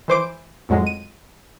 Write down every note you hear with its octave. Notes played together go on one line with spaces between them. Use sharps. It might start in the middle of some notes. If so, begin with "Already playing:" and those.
E3 C5 D6 D7
F2 A2 F#3 G#3
D#7